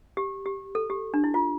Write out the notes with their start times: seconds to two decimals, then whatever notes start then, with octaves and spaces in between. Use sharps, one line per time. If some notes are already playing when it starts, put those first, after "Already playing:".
0.17 G4
0.46 G4
0.75 A4
0.90 G4
1.14 D4
1.24 E4
1.34 F4